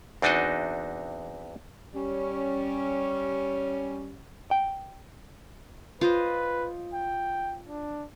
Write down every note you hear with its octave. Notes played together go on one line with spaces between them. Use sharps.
E2 C4 D4 D#4 F#4 D#5
G3 C#4
G5
F4 B4 C5 D#5
G5
D4